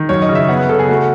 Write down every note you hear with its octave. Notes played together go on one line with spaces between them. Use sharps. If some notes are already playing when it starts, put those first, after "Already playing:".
Already playing: D#3
F#2 C#5
D#5
C#3
E5
B3 F#5
B4
C#3 A4
G#4
A3 F#4